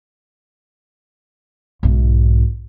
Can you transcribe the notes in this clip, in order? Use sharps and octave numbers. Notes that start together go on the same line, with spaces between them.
B1 G#2